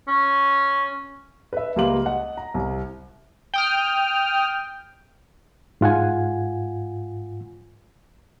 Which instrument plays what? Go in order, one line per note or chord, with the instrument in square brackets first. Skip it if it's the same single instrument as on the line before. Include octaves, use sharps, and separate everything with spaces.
[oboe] C#4
[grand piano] B4 E5
C#2 G3 A#3 F5 C6 F#7
D#5 F#5
A#5
C2
[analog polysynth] G5 D#6 F6
[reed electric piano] G#2 F4 F#5 G#5